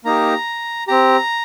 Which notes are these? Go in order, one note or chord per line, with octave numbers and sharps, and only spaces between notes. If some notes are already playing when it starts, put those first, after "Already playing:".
A#3 D#4 G4 A#5
C4 G4 A#5